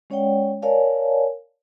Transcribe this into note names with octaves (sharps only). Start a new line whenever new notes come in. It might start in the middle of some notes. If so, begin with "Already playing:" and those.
G#3 C#4 C#5 D5 F#5 G5
A#4 C#5 D5 F5 G#5 A5